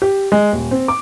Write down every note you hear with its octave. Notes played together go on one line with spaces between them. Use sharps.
G4
G#3
D#1
C4
D6